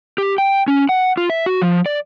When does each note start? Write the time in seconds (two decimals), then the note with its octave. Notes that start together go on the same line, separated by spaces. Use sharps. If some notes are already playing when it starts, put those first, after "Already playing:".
0.18 G4
0.38 G5
0.68 C#4
0.89 F#5
1.17 F4
1.30 E5
1.46 F#4
1.62 F3
1.86 D5